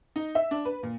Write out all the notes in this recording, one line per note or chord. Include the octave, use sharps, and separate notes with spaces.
D#4
E5
D4
B4
A#2